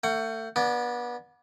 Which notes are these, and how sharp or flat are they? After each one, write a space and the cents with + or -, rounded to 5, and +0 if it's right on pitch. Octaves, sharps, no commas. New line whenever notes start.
A3 +35 F#5 +10
B3 -30 D4 +0